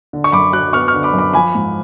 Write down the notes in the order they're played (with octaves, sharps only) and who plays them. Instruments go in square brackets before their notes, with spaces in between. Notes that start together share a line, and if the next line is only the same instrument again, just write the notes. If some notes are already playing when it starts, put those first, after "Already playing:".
[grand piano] D3
C#6
F#2 B5 D6
F#3 D6 F#6
B3 C#6 F6
C#6 F6
D3
B5 D6
F#2
B5 D6
F3 G#5 B5
G#2